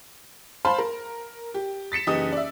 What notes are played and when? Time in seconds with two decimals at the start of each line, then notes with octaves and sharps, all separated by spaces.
0.65 C5 F5 A5 B5 C6
0.78 A#4
1.54 G4
1.92 A6 B6 C#7 E7
2.07 F#1 E3 D#4 G4 D#6
2.32 D5 E5